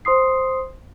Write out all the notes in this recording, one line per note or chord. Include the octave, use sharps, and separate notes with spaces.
C5 C6 D#6 C7